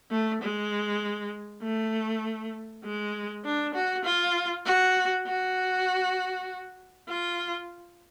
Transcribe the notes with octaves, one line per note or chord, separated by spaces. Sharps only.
A3
G#3
A3
G#3
D4
F#4
F4
F#4
F#4
F4